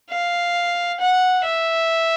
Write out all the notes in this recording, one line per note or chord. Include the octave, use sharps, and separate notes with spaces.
F5
F#5
E5